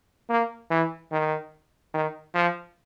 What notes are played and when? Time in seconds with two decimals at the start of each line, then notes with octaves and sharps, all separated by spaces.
0.30 A#3
0.71 E3
1.12 D#3
1.94 D#3
2.35 F3